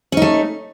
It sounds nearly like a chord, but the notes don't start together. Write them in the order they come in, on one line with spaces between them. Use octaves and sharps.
C#4 D#4 A3